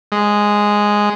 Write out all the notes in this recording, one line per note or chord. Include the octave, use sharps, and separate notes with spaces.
G#3